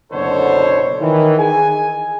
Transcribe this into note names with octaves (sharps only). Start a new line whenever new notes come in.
F#1 B2 D3 A4 C5 C#5
D#3 E3
G#4 G#5